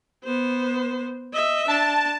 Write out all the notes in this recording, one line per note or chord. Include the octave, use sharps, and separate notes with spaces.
B3 C5
D#5 E5
D4 A5